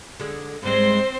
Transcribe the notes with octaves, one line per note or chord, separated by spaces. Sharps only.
D3 G#3 G#4
G#2 G3 G#3 C4 C5